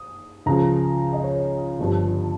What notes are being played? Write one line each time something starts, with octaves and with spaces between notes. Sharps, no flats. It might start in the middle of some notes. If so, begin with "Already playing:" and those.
Already playing: D#6
C#2 C#3 F3 A#5
D#5
C#5
C#5
G1 G2 F3